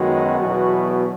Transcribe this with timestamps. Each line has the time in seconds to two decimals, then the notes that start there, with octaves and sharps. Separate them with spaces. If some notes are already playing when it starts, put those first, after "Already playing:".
Already playing: F#2 D#3 F#3 G#3 B3 F#4
0.39 E2 B2 F#3 B3